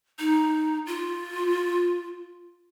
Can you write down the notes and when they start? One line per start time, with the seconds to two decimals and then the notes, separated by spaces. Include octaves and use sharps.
0.19 D#4
0.87 F4